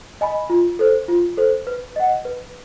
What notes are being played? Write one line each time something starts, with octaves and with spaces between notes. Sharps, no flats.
D#5 G#5 B5
F4
A4 C5
F4
A4 C5
B4
D#5 F#5
B4